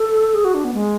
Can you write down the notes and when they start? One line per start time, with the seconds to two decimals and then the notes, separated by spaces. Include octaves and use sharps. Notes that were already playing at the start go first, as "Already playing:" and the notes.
Already playing: A4
0.34 G#4
0.45 F#4
0.54 D4
0.65 B3
0.74 G#3